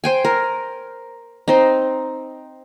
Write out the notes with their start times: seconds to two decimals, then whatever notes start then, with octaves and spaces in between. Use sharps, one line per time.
0.04 C5 G5 G#5
0.25 A#4
1.48 C4 D#4